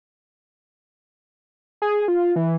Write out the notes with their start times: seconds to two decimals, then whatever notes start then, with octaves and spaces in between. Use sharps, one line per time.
1.82 G#4
2.08 F4
2.36 E3